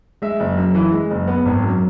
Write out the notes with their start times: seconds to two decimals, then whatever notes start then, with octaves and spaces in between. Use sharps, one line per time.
0.22 G#3 E5
0.40 F#1
0.57 F#2
0.75 E3
0.92 G#3
1.10 F#1
1.27 B3
1.45 G#1
1.63 F#2